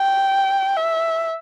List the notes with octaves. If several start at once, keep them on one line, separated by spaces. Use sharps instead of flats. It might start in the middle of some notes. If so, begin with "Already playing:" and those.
Already playing: G5
E5